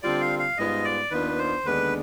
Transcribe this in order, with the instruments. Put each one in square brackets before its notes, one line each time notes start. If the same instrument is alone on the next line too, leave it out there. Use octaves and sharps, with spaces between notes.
[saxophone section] D3 G3 C4 F4 [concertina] D5
[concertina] F5
F5
[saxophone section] G#2 G3 B3 F4 [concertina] D#5
[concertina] D5
[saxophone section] D#2 D#3 B3 D4 F4 [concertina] B4
[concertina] C5
[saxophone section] D#2 D3 G#3 B3 D4 [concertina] B4